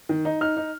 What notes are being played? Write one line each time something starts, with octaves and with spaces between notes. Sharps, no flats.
D#3
D#4
D#4 F6
D#4